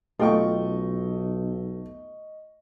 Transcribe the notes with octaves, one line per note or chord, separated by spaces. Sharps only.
B1 A3 F4 D#5 G5 C#6